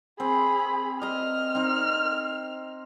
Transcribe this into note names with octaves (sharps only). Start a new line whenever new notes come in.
C4 G#4 B5
D#5 A#5 F6
C4 D#4